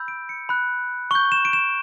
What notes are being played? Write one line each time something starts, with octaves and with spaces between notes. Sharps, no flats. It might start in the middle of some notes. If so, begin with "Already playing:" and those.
Already playing: B5 E6 G6
D7
C#7
B5 F#6
C#6 G6 G7
E7
D7
E7